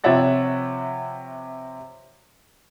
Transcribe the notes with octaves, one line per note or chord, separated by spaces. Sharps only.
C3 F3 C#5 E5 F#5 A6